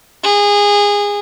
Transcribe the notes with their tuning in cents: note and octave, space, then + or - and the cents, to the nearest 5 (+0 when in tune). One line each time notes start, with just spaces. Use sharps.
G#4 -25